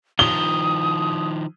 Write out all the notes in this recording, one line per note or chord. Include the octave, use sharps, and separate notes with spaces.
D#3 F3 D#6 G7